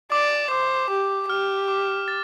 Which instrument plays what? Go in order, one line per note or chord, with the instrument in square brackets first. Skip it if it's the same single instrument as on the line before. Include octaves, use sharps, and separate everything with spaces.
[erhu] D5 [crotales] D6
[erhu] C5 [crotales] D6
[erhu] G4
[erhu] G4 [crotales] F6
[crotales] D6
A6